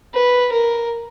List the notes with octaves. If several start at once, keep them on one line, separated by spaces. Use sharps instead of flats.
B4
A#4